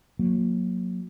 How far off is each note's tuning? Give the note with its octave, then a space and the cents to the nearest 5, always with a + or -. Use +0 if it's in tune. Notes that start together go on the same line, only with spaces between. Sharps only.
F#3 -25 A#3 +0